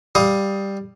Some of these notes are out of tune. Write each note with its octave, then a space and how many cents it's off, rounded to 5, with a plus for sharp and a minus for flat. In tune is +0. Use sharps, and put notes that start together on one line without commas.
G3 +5 F5 +15 D#6 +20